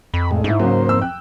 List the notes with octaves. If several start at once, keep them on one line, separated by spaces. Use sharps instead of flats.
F2 B5
A2 G#3
G#2 D#4 E4
C#2 F#3 A#3 C5
F2 E6
G5 F#6